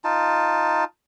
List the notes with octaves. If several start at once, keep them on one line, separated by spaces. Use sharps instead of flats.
D#4 F4 A5